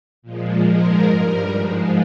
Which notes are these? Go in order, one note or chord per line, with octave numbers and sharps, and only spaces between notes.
A#2 F3 G#3
G#2 F3 G#3 A#4
G2 G3 A#4
G#2 F3 G#3